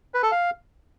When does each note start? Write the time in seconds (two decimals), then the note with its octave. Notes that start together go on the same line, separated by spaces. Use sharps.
0.14 B4
0.23 A4
0.32 F5